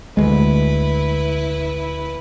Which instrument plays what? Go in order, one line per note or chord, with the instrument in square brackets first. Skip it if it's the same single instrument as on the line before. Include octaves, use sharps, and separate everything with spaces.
[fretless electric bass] D2 G#3 [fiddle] E4 B4